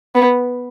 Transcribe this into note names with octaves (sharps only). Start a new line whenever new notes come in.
B3